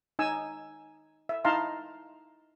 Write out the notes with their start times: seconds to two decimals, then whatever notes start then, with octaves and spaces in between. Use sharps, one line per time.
0.19 D#4 G#5 E6
1.29 E5
1.45 D#4 E4 F5 A5 A#5 C6